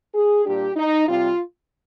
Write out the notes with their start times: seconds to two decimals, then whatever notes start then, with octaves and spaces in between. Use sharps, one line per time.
0.15 G#4
0.45 A#2 G3 D4 G4
0.76 D#4
1.08 C3 G3 C4 F4